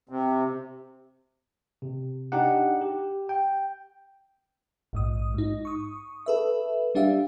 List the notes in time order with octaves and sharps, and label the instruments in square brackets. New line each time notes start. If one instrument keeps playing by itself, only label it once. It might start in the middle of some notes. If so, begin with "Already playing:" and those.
[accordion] C3
[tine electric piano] C3
D4 D#4 G4 F#5
G4
G5
[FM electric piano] A#1 G#2 D#6
G#2 D#4
C#6 D#6
A4 B4 E5
G3 D4 G4 E5 F5